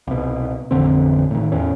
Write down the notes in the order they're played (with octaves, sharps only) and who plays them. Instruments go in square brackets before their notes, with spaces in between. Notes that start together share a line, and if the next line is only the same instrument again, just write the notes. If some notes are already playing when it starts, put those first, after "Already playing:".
[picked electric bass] C2 B2
A1 F2 D3 C4
A2 D#3
E2 A2 C#4